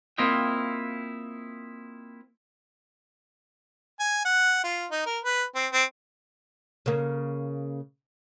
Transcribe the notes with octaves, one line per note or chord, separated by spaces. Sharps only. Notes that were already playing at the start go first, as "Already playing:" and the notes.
A#3 C4 E4 F4 D#5 G5
G#5
F#5
F4
D#4
A#4
B4
C4
C4
C#3 A#3